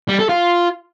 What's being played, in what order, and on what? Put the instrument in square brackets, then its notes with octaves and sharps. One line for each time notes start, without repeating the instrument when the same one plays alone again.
[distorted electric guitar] G3
A4
F4